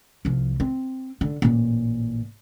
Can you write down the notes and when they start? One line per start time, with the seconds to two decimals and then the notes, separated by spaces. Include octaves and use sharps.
0.25 C2 F3
0.60 C4
1.21 D3
1.42 A1 A#2